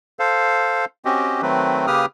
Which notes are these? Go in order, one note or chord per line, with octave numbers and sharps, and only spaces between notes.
A4 C5 F5
C4 C#4 F#4 G4 D#5
D#3 F#3 A3 C4 B4
C#3 A#3 G4 B4 D#6 F6